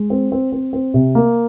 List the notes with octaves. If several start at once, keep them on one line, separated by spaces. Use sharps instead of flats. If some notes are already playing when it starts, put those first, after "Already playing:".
Already playing: G#3
C4
C4
C4
C4
C3
A#3